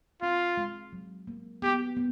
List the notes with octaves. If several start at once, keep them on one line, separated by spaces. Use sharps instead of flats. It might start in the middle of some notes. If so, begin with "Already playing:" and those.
C4 F4
G#3
F#3
A#3
B3 G4
B3